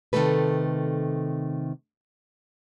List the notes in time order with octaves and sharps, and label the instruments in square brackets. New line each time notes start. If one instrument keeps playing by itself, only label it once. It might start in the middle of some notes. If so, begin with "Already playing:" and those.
[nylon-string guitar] C3 D#3 F3 A3 A4 B4